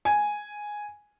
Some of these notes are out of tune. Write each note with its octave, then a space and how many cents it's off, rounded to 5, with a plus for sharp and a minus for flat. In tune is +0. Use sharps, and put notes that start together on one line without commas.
G#5 +0